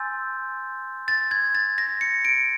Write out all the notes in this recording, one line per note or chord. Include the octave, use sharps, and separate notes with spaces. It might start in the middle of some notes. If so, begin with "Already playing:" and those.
Already playing: G#5 C6 E6 G6 A6
A6
G#6
A6
A#6
C#7
D7